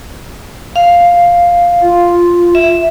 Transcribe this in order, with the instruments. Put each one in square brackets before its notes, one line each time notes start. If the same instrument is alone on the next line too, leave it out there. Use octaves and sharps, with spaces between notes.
[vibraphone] F5
[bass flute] F4
[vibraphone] E5